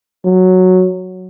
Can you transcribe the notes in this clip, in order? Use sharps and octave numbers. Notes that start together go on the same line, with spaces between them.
F#3